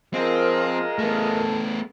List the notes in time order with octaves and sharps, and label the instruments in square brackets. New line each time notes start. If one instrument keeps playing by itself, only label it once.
[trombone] F3 [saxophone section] G#3 F4 D#5 [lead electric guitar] C4 [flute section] A#4
[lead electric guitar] A3 B3 [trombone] A4